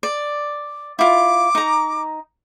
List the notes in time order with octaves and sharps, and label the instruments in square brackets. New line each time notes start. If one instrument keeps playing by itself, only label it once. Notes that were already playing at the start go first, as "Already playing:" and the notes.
[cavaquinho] D5
[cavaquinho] E4 F4 [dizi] D6
[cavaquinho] D#4 A#5